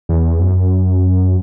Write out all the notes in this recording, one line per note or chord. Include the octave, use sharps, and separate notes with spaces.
E2
F#2